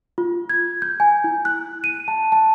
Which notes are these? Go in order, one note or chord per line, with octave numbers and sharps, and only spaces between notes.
F4
G#6
G6
G#5
E4
F#6
D#7
A5
A5